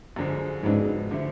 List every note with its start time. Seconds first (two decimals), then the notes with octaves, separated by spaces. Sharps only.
0.16 F#2 D3 F3 G#3
0.63 F2 G#2 C#3 F#3 B3 D4
1.11 D3 F3 A3